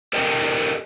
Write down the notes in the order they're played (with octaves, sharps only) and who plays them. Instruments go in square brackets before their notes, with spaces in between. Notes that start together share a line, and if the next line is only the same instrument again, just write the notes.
[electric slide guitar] G4 A4 A#4 D5 D#5 G5